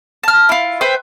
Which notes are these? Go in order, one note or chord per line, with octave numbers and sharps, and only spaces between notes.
A5 F6
E4 F4
B4 C5 E5 G5